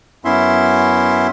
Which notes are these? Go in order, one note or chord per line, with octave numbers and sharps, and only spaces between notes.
F#2 B3 C#4 E4 E5 C6